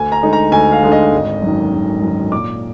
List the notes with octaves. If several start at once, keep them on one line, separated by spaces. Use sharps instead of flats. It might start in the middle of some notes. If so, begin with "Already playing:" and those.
Already playing: D2 G#5
A#5
D3 G#3 D#4
A#5
D2 G#5
F5
D3 G#3 D#4
D#5
G#1
F#2 D#3
G#1
F#2 D#3
A#2 D6